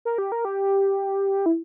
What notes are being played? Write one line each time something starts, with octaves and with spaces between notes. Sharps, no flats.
A#4
G4
A#4
G4
E4